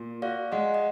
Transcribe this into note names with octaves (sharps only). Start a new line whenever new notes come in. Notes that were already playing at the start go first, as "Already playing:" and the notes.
Already playing: A#2
F#4 D5 F5
G#3 D#5 F#5
D#5